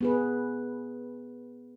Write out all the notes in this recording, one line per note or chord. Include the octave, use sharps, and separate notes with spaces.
B3 G#4 B4